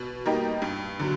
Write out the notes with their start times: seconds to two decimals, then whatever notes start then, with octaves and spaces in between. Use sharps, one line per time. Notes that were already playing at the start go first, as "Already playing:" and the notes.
Already playing: B2
0.26 G3 A#3 D#4 G4
0.62 G2
0.99 D3 F#3